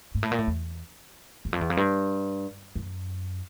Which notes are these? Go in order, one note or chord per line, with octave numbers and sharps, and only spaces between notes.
G#2
A2
A#2
A2
E2
E2
F2
E2
F2
G2
F#2